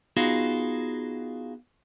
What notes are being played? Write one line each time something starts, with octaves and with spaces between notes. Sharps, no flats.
B3 D#4 F4 F#4 G#4